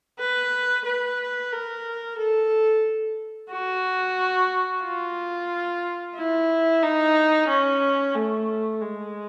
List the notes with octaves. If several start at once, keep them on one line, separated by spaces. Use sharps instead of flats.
B4
B4
A#4
A4
F#4
F4
E4
D#4
C#4
A3
G#3